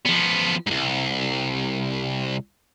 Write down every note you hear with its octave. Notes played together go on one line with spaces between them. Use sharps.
F3 B3
C2 G#2